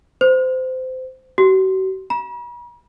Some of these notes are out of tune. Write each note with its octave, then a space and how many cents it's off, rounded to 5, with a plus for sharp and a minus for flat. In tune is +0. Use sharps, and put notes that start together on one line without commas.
C5 -20
F#4 +45
B5 -45